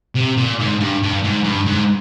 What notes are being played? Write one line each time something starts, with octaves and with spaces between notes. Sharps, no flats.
C3
A#2
G#2
G2
G2
G#2
G2
G#2